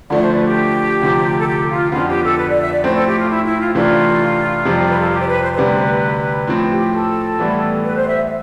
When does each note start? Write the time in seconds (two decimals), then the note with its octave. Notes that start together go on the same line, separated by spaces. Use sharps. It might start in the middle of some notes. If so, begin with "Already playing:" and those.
0.10 D2 D3 F3 A3 D5
0.21 C5
0.34 B4
0.45 G4
1.02 D2 C3 F3
1.39 A4
1.47 G4
1.70 F4
1.92 F2 D3 F3 B3 F4
2.08 G4
2.23 A4
2.38 B4
2.50 D5
2.61 E5
2.72 D5
2.84 A2 F3 A3 C4 C5
2.95 A4
3.07 G4
3.18 F4
3.30 E4
3.44 E4
3.60 F4
3.75 C3 E3 A3 D4 F4
4.65 F2 C3 G3
4.87 B4
4.99 A4
5.11 G4
5.20 C5
5.27 B4
5.42 C5
5.53 C5
5.56 D2 C3 G3 B4
6.48 A2 F3 C4
6.71 G4
6.94 A4
7.39 A2 E3 G3 B3
7.84 B4
7.97 C5
8.07 E5